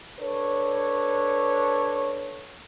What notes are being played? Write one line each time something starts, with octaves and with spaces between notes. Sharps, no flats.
D4 A4 B4 C#5